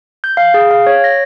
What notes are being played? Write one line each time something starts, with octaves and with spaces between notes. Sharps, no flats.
G6
F5
G#4
F5
C#5
A#6